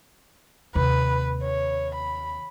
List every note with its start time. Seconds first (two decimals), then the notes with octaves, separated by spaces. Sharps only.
0.75 D#2 C3 B4
1.43 C#5
1.95 B5